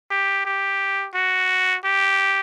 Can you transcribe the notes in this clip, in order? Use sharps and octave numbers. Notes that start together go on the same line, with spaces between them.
G4
G4
F#4
G4